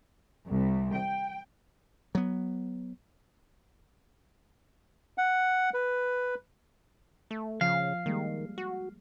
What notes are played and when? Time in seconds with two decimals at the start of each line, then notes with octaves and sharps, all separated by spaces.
0.47 C2
0.94 G5
2.15 F#3 B3
5.18 F#5
5.74 B4
7.31 A3
7.61 C#3 F3 F5
8.06 D#3 G3 G#3 A#3
8.58 F#4